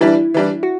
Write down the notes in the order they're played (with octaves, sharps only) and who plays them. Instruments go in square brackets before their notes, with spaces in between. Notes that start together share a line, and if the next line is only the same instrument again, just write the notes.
[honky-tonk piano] E3 G3 D4 [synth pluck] E4
[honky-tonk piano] E3 G3 D4
[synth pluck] F#4